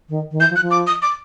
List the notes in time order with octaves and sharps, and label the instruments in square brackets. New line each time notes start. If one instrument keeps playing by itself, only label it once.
[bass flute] D#3
D#3
[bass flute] E3 [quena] G6
[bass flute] F3
[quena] F#6
[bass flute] F3
[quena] D6
D#6
D6